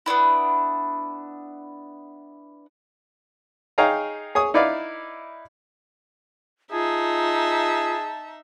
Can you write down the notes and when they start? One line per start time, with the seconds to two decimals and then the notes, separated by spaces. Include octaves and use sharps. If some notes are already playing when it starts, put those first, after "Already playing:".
0.06 B3 C#4 D4 E4
3.78 D#4 G#4 C#5 F5 G5 A#5
4.35 G#4 C#5 D#6
4.54 D#4 E4 B4 D5 E5 F5
6.72 D#4 F4 G#4 E5 A5